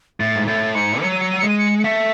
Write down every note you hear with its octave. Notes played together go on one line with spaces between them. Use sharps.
A2 A6
G#2
A2 A6
G#2 C#7
F#3 C#7
D#7
C#7
D#7
G#3 C#7
D#7
C#7
C#7
A3 B6